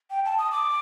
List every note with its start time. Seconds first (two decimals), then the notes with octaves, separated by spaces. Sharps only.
0.10 G5
0.25 A5
0.38 D#6
0.52 D6